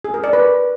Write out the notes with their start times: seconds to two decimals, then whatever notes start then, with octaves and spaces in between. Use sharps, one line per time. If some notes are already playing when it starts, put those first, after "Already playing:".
0.04 G#4
0.14 A#4
0.24 D5
0.33 B4